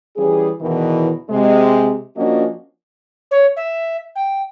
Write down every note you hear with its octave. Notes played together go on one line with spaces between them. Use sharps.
E3 G3 C#4 G#4
E2 B2 D#3 E3
C3 G#3
F3 A#3 C#4 D4 F#4 D#5
C#5
E5
G5